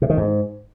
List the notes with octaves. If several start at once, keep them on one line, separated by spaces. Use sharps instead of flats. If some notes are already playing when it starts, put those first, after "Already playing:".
C3
D#3
G#2